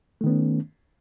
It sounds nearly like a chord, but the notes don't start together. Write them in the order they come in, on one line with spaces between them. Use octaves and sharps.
A3 D#3 B3 C#4